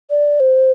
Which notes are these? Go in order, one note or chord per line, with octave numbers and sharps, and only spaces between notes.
D5
C5